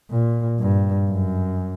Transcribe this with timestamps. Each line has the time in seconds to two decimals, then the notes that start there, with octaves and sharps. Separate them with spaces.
0.10 A#2
0.60 G2
1.10 F#2